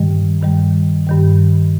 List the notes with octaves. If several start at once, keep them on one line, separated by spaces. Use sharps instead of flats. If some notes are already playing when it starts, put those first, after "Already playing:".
Already playing: G2 D#3 G3
G2 D#3 G3
G2 D#3 G3